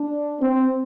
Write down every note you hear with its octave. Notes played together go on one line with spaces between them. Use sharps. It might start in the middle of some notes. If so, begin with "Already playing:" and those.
Already playing: D4
C4